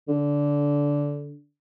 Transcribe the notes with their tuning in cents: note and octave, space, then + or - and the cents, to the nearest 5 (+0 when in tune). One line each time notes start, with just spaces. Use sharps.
D3 -15